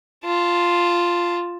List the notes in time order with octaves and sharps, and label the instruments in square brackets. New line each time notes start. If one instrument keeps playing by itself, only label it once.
[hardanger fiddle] F4 A5